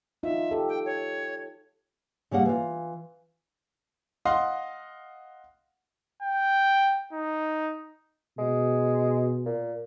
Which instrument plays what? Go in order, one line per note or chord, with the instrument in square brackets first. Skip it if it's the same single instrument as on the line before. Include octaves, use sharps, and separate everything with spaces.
[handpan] D#4 F4 [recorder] E5
[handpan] G4 A4
[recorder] G5
C#5
[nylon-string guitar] C#3 G3 A#3 F#5
E3 F4
[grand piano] D#5 F5 F#5 C6
[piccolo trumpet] G5
D#4
[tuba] B2 [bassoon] G#3
[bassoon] A#2